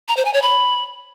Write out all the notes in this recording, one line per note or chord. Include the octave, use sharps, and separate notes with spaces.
A#5
C5
G#5
C#5
B5